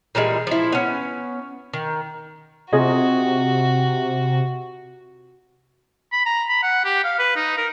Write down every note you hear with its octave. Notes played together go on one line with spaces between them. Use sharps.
A#2 E3 G3 G#3
F3 E4
B3 C#4
D#3
C3 F4 F#4 G#4 D#5
B5
A#5
B5
F#5
G4
F5
B4
D#4
A#4